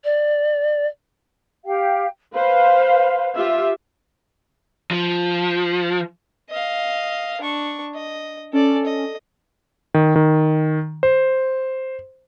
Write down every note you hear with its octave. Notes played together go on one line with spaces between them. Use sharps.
D5
G4 F5 G5
B4 C5 F5
F4 G4 E5
F3
D#5 F5
D4 C#6
D#5
C#4 A4 D5
D#5
D#3
D#3
C5